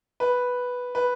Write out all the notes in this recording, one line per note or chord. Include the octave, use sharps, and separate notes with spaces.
B4
B4